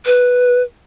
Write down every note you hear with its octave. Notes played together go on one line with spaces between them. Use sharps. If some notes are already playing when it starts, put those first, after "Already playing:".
B4